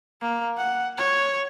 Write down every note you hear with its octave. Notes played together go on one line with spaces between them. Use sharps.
A#3
F#5
C#5